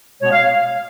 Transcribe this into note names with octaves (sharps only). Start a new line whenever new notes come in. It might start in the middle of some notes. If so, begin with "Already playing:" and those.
B2 G#3 B3 C#5
F5